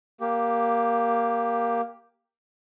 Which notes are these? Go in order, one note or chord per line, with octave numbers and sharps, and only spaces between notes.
A#3 G4